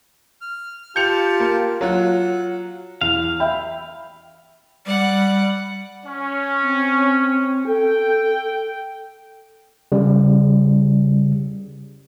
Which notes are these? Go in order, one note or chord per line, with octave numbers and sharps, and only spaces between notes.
F6
F4 G4 A5 G6 C#7 F7
A#3
F#3 F4 F#5
E2 F5
E5 G5 B5
G3 D5 F#5
C#4
C4
A4 G5
C#3 G3